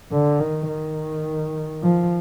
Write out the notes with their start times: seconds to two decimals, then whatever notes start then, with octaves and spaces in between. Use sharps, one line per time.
0.12 D3
0.40 D#3
0.69 D#3
1.83 F3